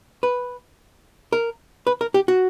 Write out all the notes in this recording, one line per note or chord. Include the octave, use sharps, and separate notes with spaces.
B4
A#4
B4
A#4
G4
F#4